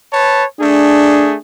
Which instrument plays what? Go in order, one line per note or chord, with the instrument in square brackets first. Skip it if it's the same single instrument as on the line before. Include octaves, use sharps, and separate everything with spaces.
[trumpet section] B4 C#5 A5
[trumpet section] A3 G#4 [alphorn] D4